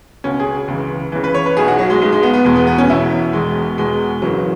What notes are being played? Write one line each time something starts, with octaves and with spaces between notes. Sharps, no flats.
C#2 B2 C#4
G#4
C#2 C#3 E3
C#2 C#3 E3
B4
C#5
B4
B1 B2 G#4
F#4
F#3
G#3
B1 B2 G#3
G#3
B3
B3
E1 E2 B2 G#3
B3
B3
C#4
E1 E2 B2 E4
E1 E2 B2 G#3
E1 E2 B2 G#3
F#1 F#2 C#3 E3 F#3